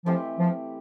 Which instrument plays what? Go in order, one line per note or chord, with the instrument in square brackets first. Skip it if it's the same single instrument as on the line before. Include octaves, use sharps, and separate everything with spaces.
[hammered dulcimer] E3 A3 C4 G4 [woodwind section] F3
[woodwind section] F3